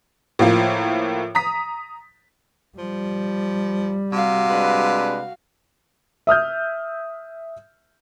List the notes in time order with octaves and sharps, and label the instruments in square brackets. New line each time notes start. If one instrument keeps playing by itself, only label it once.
[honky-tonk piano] A2 F3 A#3
A#5 D#6 B6
[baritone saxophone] F3 [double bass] G3
[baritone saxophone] C3 [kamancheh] F#4 F5
[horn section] G#3 D4 B4
[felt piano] E5 D#6 F6 G6